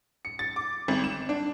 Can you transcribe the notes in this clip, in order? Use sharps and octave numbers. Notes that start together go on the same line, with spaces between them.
C#7
A6
D6
G#1
E7
D4